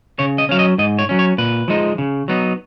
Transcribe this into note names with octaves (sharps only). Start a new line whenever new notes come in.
C#3 C#5
D#5
F#3 C#4 F5
D#5
G#2 D#5
C#5
F#3 C#4
C#5
A#2 B4
F3 G#3 D#4
C#3
F#3 B3 D#4